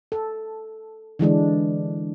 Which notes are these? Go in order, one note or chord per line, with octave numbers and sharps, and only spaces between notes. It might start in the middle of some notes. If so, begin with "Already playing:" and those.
A4
D3 E3 G#3 D4